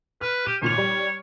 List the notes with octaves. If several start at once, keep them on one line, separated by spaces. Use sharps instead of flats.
B4 F6
G4 D#7
G#1 A#2 C#5 F7
G3